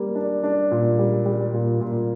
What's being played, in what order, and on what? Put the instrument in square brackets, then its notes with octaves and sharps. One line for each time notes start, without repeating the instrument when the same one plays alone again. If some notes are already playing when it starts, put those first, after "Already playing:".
Already playing: [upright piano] G3 A#3
D4
D4
A#2
G3
G3
A#2
A#2